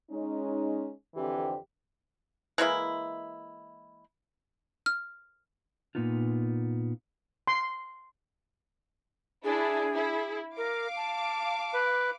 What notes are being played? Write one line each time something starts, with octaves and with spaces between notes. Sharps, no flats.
G#3 C#4 D#4
F2 D3 E3 C4 G4
E3 G#3 A#3 E4
F6
A#2 D3 A#3 B3 D#4 F4
C6
D4 E4 G#4
E4
A#4 F5 D6
A5
B4